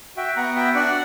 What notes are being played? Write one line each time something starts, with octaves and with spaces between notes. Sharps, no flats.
F#4 E5 G5
B3 F#5 A#5
F#4 E5 G5
D4 D5 F#5